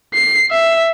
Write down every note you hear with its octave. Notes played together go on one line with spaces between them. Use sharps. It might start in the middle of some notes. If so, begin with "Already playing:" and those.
C7
E5